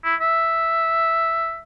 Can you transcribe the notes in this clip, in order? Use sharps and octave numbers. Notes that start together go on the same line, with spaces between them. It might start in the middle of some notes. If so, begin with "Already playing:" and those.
E4
E5